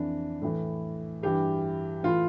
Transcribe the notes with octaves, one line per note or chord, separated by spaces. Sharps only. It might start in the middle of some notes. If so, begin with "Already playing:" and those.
Already playing: F2 E3 D4
A2 E3
G2 E3 G4
A2 E3 F4